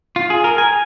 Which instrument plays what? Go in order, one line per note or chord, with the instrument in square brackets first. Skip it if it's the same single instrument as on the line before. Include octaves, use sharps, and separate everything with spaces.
[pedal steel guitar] F4
G#4
A#4
G#5